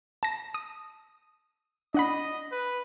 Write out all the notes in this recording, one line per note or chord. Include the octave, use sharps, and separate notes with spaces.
A5 A#6
D#6
D4 D#5 F#5 B5
B4